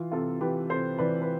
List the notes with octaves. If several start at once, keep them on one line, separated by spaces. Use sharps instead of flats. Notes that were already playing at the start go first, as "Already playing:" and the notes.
Already playing: E3 F4
C3 F4 A4
E3 G4 B4
C3 A4 C5
E3 B4 D5
B4